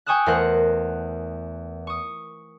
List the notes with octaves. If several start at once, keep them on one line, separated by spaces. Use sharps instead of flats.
G5 G#5 C#6 D#6 E6 F#6
E2 A3 A#4 C5 F#5 A#6
C#6 D#6